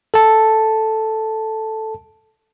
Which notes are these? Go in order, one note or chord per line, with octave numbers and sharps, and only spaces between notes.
A4 A5